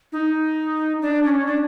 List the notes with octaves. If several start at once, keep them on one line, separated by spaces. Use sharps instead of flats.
D#4
D4
C#4
D4